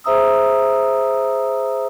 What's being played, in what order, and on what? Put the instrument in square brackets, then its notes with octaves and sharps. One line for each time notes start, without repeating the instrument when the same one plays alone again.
[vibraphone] G#4 C5 E5 A#5 D#6 E6